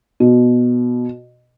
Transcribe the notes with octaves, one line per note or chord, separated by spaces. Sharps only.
B2